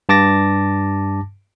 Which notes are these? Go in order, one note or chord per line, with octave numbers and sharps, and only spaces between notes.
G2 A5 D6 A6 A#6